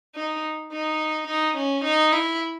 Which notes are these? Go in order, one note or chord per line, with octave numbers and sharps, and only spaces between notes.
D#4
D#4
D#4
C#4
D#4
E4